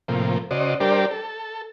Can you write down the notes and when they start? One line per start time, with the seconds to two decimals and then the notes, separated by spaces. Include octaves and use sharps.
0.08 A2 C3 F3 A#3
0.51 C#3 F#4 C5 D5 D#5
0.80 G3 D4 G4 A#4 C5 D5
1.11 A4